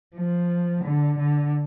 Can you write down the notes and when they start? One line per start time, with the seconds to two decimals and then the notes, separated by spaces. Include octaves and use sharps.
0.16 F3
0.84 D3
1.19 D3